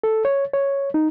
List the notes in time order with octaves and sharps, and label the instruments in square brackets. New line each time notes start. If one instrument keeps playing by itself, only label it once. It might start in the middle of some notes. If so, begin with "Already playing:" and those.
[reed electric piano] A4
C#5
C#5
D#4